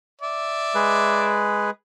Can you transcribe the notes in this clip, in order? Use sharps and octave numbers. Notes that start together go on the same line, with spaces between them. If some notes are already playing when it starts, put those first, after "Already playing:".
D5 E5
G#3 G#4 B4